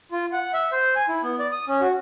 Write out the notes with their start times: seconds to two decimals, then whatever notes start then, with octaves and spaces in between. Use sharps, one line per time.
0.12 F4
0.32 F#5
0.53 E5
0.72 C5
0.96 G#5
1.09 E4
1.23 B3
1.39 D5
1.52 D#6
1.68 C#4
1.81 F#4